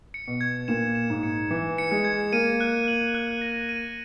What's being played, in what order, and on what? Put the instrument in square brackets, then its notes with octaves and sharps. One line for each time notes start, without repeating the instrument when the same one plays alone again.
[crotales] C#7
[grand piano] B2
[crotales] G#6
[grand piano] A#2 [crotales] E7
[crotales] E7
[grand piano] G#2
[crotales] C#7
[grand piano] E3 [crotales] C#7
[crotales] C#7
[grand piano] G#3
[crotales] G#6
[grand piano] A#3 [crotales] D#7
[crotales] F#6
F#7
F#6
A#6
D#7